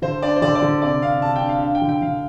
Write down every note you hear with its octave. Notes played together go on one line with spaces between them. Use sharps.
D3 C5
D4 D5
C5
D3 D5
D5
D3
C3 D5
C3 F5
C3 A5
G5
D4
F5
D4 F5
G5
D3
G5
D3 F5